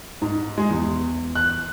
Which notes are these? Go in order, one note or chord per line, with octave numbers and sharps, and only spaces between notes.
G#2
G#3
E2
F#6